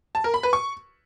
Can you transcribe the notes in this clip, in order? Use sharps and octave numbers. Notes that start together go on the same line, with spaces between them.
A5
A#4
B5
B4
C#6